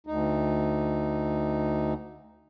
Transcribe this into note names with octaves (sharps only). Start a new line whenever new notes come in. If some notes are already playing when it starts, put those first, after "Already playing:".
D2 D#4